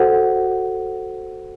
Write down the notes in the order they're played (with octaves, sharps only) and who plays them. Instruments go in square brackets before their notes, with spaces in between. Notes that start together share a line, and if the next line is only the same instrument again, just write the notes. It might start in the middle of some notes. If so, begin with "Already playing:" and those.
Already playing: [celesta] F#4 A4 C5 F#5